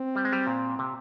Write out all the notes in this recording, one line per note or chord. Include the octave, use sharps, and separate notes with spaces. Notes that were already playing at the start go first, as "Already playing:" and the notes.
Already playing: C4
G3
G#3
G3
A#2
C3